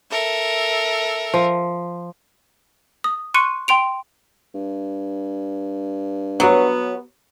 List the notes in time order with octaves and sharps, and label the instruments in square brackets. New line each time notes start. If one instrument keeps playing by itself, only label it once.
[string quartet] A4 A#4 E5
[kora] F3
[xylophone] D#6
C6 C#6 F#6 C#7 D#7
G5 C6 D7 F7
[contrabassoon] G2
[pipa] F#3 [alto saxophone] B3 [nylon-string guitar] F#4 B4 C#5